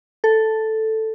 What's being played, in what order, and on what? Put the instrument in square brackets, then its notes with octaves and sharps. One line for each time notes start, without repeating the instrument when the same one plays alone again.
[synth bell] A4